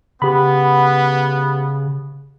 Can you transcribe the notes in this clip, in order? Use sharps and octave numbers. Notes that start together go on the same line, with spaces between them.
C#3 B3 G4 B5